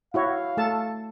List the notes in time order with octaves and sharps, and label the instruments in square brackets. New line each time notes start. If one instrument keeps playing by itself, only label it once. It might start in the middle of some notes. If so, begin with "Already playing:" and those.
[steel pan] E4 F#4 C#5 [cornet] F5
[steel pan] A3 A4 A5